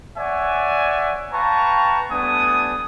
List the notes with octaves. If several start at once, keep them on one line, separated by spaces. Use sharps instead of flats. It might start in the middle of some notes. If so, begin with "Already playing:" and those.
C#5 D5 E5 F#5 G#5
B4 F5 G5 A5 A#5 C#6
G3 A3 B3 D4 G#5 D#6